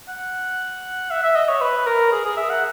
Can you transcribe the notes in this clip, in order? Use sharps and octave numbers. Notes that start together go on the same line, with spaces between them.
F#5
E5
E5
D#5
C#5
B4
A#4
G#4
G#4
E5
F#5